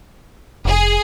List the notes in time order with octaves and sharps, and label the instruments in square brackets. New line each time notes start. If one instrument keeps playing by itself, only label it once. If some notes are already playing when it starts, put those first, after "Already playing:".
[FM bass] F1 [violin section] G#4